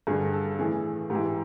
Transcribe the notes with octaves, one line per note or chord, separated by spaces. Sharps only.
G2 D3 G#4
A4
A2 E3 G#4
G#2 E3 G4